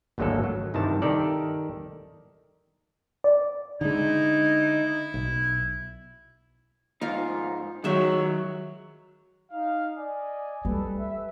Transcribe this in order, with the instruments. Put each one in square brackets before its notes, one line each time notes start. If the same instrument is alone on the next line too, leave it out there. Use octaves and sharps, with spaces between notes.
[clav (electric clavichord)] G#1 D2 F#3 G#3 A#3 A4
F#3
G2 C3 D#3 E3 E4 A5
D#3 G4 A4 A#4 D5
[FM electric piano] D5
[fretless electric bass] D3 G#3 [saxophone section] D#4 [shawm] E4
[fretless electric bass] B1
[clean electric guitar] G#2 F3 D#4 [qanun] F4 A#4
[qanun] D#3 E5 G5 [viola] F#3 [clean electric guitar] G#3 C#5
[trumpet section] D#4 F5
D5 D#5 G#5
[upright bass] G3 [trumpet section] A4 B4
[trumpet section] B4 E5